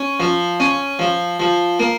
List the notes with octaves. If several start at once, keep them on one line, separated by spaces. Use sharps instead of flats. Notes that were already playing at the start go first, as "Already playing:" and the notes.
Already playing: C#4
F3
C#4
F3
F3
A#3